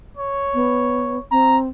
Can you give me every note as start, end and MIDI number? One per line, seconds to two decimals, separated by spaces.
0.17 1.23 73
0.54 1.18 59
1.31 1.68 60
1.31 1.58 82